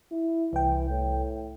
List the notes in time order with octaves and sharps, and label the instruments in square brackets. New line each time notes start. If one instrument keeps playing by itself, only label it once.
[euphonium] E4
[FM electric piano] C2 G5 [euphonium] E3
[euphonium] A2